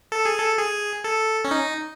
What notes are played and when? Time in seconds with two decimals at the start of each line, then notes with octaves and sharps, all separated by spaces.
0.12 A4
0.25 G#4
0.38 A4
0.58 G#4
1.04 A4
1.45 C#4
1.51 D#4